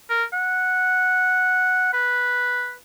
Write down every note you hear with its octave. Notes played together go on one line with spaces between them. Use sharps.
A#4
F#5
B4